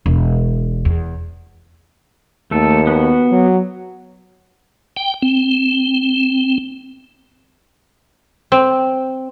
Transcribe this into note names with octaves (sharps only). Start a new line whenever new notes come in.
E1
E2
D#2 A3 A4
B3 F#4
F#3
G5
C4
C4